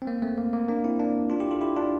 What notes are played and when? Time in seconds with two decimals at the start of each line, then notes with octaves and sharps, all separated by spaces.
0.02 C4
0.07 A#3
0.22 A3 C4
0.38 A#3
0.53 A#3
0.69 A#3 D4
0.84 C4 E4
0.99 A#3 D4
1.30 D4 F4
1.40 E4 G4
1.51 F4 A4
1.61 E4 G4
1.76 D4 F4